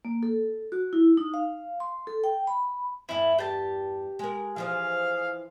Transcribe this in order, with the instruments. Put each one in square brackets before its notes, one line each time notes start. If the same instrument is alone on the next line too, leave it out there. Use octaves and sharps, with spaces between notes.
[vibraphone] A#3
A4
F#4
E4
D#4
F5
C6
A4
G5
B5
[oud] E2 G2 [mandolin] E4
[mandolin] G4 A5
[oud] G#3 A#4
[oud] E3 F3 C5 [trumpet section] G#4 F5